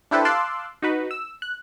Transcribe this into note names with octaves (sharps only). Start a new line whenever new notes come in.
D4 E4 G4 A4 B4 C5
F5 A5 C6 D6 E6 F#6
D#4 F#4 B4
E6
F#6